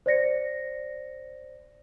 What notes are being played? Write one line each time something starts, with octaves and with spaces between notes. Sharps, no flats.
C5 D5 A#6 C#7